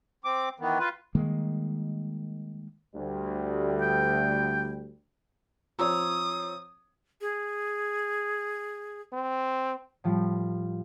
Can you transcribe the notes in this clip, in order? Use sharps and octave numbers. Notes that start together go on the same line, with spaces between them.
C4 D6
D#3 E3 B3
F4 B4
D#3 G3 G#3 A#3
D2 G3
G5
F3 C4 C#5 A#5 D#6 E6
G#4
C4
A2 F3 G3 C6